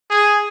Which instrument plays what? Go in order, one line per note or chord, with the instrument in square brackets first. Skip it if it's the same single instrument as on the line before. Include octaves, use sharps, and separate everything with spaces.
[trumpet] G#4